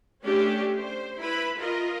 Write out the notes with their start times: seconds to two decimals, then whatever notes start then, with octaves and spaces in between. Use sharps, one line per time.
0.23 A3 C#4 D4 G4
0.79 C5
1.20 E4 B4 B5
1.59 F4 A#4 D#5